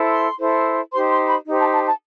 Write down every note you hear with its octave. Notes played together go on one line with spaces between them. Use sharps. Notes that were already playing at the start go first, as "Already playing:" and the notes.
Already playing: E4 A4 C5
C6
E4 A4 C5
D#4 G4 C5 C6
C6
B5
D#4 G4 C5
A5
A5
A5